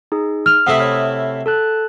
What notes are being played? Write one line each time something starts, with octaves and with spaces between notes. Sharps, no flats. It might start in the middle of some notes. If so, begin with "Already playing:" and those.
D#4 G#4
F6 F7
C3 A3 E4 E5 F#5 D#6
C#5 F6
A4 A5 F#6